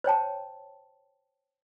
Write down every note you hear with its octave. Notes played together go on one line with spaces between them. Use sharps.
C5 C#5 G5 A5